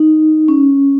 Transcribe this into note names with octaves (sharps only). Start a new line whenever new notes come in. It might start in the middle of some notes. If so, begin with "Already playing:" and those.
Already playing: D#4
C#4